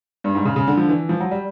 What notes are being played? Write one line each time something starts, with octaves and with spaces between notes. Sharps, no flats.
G2
G#2
C#3
C#3
D3
F3
E3
F3
F#3
G3